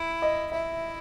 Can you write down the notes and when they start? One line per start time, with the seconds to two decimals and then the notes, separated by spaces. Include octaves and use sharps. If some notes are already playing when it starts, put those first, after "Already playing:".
Already playing: E4
0.22 D#5
0.51 E4 E5